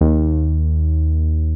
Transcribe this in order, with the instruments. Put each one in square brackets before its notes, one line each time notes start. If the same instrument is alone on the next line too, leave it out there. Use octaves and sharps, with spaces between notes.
[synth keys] D#2